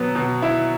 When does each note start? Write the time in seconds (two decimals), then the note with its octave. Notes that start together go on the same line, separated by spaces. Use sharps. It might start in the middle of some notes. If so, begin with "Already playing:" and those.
Already playing: B2 F#3 B3
0.15 B2
0.42 E4